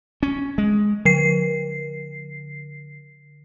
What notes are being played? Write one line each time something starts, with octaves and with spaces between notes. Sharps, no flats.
C#4
G#3
D3 C7